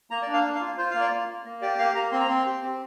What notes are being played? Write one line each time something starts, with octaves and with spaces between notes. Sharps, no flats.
A#3 A#5
D5
D4
F5
A#3
F5
F4
F4 C5
A#3 F5
D5
A#3
A#3
A#3
G4 D5
A#3 F5
A#3 A#5
C4 C6
A#5
C4 C6
G4
C4